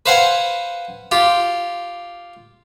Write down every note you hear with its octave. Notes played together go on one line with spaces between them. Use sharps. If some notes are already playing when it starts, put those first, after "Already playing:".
B4 C5 F5 F#5 G#5
F4 G4